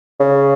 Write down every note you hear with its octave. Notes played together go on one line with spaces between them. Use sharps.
C#3